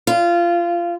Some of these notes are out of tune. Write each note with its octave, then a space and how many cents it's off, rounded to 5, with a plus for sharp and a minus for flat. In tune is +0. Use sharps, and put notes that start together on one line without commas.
F4 -20